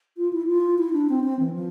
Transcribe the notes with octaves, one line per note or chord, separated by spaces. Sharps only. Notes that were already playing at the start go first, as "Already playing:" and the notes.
F4
E4
F4
E4
D4
C4
C4
E3
F3